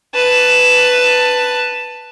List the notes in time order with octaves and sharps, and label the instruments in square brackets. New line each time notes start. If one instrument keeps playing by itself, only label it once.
[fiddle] B4 A5